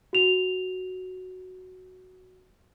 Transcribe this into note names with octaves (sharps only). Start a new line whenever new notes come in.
F#4 F7